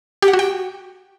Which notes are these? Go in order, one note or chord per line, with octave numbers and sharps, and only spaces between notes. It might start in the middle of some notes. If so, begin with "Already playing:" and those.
G4
F#5
F#4
G5